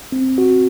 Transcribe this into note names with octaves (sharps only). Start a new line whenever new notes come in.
C4
F#4